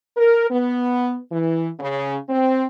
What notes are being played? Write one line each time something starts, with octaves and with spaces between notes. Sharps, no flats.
A#4
B3
E3
C#3
C4